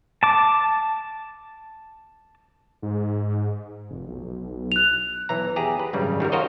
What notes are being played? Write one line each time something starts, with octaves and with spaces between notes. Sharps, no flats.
A5 D6
G#2
F1
B1
F#6 F7
B1 E3 A#5
E2 G4 G#4 A#5
B4
G#1 F#2 C#3 G3
D#3 G3 F#4 A#4
F4 F#4 A#4 C5 C#5 D#5